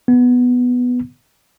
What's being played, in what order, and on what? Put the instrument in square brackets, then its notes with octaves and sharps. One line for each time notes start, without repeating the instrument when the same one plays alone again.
[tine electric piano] B3